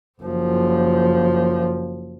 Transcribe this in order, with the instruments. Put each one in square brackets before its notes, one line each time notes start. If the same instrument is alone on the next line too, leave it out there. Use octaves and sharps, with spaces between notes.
[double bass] F#1 F3